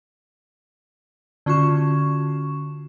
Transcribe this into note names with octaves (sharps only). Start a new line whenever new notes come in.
D3 C#4 F4 F#4 C#6 E7